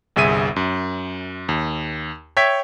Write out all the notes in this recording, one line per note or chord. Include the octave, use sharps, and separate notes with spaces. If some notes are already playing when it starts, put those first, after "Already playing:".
G1 C2 G#4 E5 D#7
F#2
D#2
C#5 E5 G5 G#6 B6